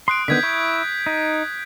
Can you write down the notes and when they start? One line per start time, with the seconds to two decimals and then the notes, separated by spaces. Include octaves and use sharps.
0.08 C6 D#6 F#6 D7
0.28 D3 D#3 B3 G6 G#6 B6
0.43 E4 C#6
1.06 D#4